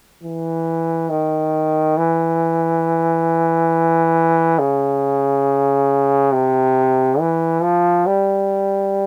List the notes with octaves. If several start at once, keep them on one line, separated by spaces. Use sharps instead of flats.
E3
D#3
E3
C#3
C3
E3
F3
G3